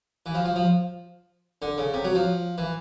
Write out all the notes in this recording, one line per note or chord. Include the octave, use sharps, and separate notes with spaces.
E3
F3
F3
F3
D3
C#3
C3
F#3
F3
E3